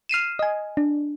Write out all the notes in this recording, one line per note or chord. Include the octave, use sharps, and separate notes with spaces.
F6 C7 D#7 E7
D#5 G#5
D4